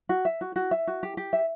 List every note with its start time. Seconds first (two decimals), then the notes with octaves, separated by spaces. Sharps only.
0.09 F#4
0.25 E5
0.41 F#4
0.56 F#4
0.71 E5
0.87 F#4
1.03 G4
1.17 G4
1.33 E5